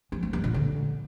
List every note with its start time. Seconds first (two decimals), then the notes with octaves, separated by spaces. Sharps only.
0.12 F3
0.23 A3
0.33 G2
0.44 A#2
0.54 D3